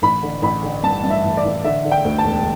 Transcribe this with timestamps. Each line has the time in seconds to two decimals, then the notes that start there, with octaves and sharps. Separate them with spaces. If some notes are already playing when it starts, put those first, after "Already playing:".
0.02 A1 B5
0.23 D3
0.42 A1 B5
0.63 D3
0.83 G2 A5
1.03 G2
1.10 E5
1.24 A1
1.37 D5
1.44 A1
1.64 D3 E5
1.85 D3
1.91 G5
2.05 D2
2.18 A5
2.24 E1